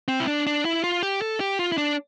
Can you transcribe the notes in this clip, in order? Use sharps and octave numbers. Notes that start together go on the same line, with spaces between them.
C4
E4
D4
D4
E4
F4
G4
A4
G4
F4
E4
D4